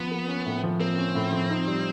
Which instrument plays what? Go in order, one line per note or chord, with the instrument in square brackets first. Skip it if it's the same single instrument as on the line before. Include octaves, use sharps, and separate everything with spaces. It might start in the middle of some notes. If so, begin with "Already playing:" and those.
Already playing: [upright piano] F3 [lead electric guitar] B3
[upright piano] A#3
C#4
A2
F3
[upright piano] A#3 [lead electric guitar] C4
[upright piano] C#4
A2
F3
D#4
G3